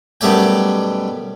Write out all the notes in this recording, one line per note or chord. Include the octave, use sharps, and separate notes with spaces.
F#2 B2 G3 A3 D5 G5